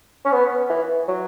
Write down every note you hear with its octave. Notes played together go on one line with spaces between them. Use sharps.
C#4
B3
E3
F#3